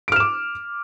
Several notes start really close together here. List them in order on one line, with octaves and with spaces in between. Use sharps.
D7 F6 E7 D6